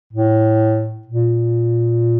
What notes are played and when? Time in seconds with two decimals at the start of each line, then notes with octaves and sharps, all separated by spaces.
0.13 A2
1.07 A#2